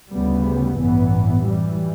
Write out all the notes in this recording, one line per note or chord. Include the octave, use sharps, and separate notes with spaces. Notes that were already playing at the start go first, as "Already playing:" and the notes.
D2 C#3 G3 B3
A1 G2 E3 B3
F#2 E3 G3